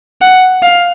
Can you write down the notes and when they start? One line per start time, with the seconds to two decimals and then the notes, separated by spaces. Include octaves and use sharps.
0.21 F#5
0.62 F5